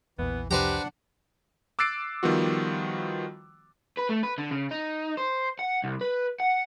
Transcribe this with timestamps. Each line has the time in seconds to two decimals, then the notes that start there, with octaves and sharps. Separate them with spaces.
0.19 A#1 E2 E3 B3
0.51 C2 F2 D4 G4 B4 C5 F#5 A#5
1.79 D6 E6 F#6 A6 C7 D7
2.23 D#3 F3 G3 B3 F4 F#4
3.98 B4
4.10 A3
4.23 B4
4.38 D3
4.51 C#3
4.71 D#4
5.17 C5
5.59 F#5
5.84 C2
6.01 B4
6.40 F#5